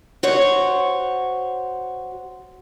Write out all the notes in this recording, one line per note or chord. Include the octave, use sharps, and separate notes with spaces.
F#4 C5 C#5